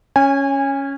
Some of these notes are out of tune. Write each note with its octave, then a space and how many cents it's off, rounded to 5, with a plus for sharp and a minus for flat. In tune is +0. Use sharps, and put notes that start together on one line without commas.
C#4 +0 G#5 -25